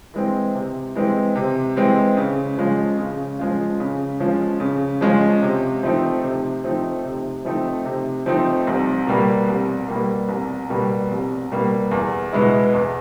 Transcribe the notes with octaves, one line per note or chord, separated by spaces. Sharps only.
E3 G#3 C4
C3
E3 G#3 C4
C3
E3 G#3 C4
C#3
F3 G#3 C#4 F4
C#3
F3 G#3 C#4 F4
C#3
F3 G#3 C#4 F4
C#3
F3 G#3 C#4 F4
C3
F3 A3 C4 D#4
C3
F3 A3 C4 D#4
C3
F3 A3 C4 D#4
C3
F3 A3 C4 D#4
C2
B2 G3 A#3
C2
B2 G3 A#3
C2
B2 G3 A#3
C2
B2 G3 A#3
E2
B2 G#3 B3 E4
E2